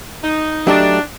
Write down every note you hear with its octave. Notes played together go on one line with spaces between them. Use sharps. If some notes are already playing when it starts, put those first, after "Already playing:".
D#4
F#3 A3 D4 D#4 G4